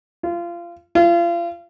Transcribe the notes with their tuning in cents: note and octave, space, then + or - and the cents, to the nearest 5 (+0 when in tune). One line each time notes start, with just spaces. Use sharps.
F4 -25
F4 -35